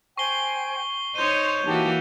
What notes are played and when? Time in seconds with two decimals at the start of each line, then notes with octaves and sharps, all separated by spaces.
0.18 C5 G5 G#5 C#6 C7 G7
1.15 D#4 C5 C#5 C6 G6 D#7
1.65 E3 A#3 D#4 F#4 G4 A5